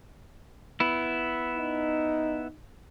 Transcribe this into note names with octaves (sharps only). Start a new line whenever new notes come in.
B3 E4
D#4